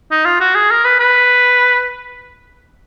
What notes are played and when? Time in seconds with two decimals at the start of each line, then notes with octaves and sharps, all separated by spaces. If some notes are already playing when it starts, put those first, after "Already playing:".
0.11 D#4
0.25 F4
0.40 F#4
0.55 G#4
0.71 A#4
0.85 B4
1.00 B4